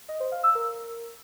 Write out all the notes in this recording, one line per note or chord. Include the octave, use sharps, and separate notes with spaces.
D#5
C5
F5
E6
A#4